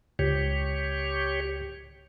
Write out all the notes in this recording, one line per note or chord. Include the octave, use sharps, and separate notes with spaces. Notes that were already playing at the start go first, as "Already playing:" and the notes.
C#2 G4 C#5